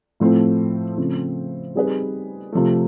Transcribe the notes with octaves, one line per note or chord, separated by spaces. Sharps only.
A2 F3 A3 C4
C#3 F3 A3 C4
G3 C4 D#4 G#4 B4
C3 F3 A3